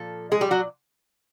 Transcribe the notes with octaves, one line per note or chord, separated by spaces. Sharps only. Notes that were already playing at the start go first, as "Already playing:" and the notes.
Already playing: A#2 F3 A4
G#3 G#4
G3 G4
F#3 F#4